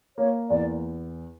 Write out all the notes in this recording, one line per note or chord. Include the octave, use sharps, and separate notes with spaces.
A#3 C#5
E2 D5